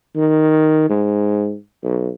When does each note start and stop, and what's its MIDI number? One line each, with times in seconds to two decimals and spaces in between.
0.16 0.89 51
0.89 1.54 44
1.84 2.09 35